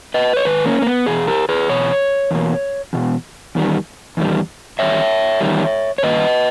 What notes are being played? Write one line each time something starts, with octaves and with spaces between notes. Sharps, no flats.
B4 D#5
C#5
G#2 D#3 B4
A#3 C#4
A#3
B3
E2 B2 G#4
G4 A#4
G#4 B4
E2 B2 C#5
E2 B2 A#3
E2 B2
E2 D#3 G3
E2 D#3 G3
E2 D#3 G3 C#5 E5
E2 D#3 G3
C#5
G2 D#3 A#3 B4 D#5